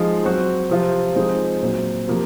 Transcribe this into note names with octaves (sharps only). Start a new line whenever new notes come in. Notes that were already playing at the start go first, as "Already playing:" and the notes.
Already playing: F3 G#3 D#4
F#3 C4 F#4
C3 F3 C4 F4
F3 G#3 C4 D#4
A#2 F#3 C4
C3 F3 A#3